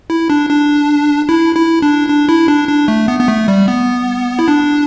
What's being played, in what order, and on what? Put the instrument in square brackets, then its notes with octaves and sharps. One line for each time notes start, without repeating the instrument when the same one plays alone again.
[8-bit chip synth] E4
D4
D4
E4
E4
D4
D4
E4
D4
D4
A3
B3
B3
A3
G3
B3
E4
D4